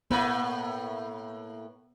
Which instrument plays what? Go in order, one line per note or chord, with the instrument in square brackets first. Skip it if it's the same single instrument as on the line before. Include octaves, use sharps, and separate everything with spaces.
[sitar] A2 A#3 B4 [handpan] B3